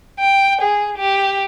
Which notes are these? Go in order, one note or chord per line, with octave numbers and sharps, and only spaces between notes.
G5
G#4
G4